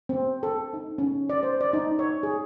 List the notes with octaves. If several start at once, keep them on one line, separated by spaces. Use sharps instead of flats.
C4
A4
D#4
C#4
D5
C5
D5
D#4
C#5
G#4